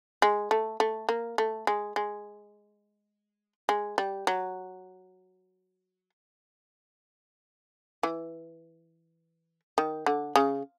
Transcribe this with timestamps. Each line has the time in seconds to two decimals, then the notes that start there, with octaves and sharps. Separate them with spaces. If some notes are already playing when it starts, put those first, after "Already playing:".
0.22 G#3
0.51 A3
0.80 A3
1.09 A#3
1.38 A3
1.67 G#3
1.96 G#3
3.69 G#3
3.98 G3
4.27 F#3
8.03 E3
9.78 D#3
10.06 D3
10.36 C#3